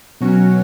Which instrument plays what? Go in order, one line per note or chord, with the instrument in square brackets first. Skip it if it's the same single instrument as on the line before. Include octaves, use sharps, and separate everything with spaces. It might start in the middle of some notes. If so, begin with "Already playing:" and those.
[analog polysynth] B2 F#3 C#4 F#4